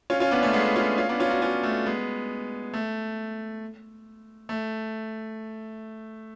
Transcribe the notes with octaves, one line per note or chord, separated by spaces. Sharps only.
C#4 F4
C#4 F4
B3 D4
A3 C#4
G#3 B3
C#4 F4
C#4 F4
B3 D4
C#4 F4
D4 F#4
C#4 F4
A3
G#3 B3
A3
A3